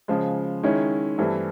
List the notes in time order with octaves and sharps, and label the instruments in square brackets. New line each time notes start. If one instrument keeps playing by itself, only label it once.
[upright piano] C#3 F3 G#3
D#3 G#3 C#4 E4
G2 E3 A3 C4 E4